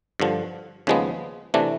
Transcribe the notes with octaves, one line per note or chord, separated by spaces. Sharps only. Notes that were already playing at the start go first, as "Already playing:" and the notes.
G2 D3 F3
D#2 C#3 F3 G#3 B3
C3 E3 A3 D4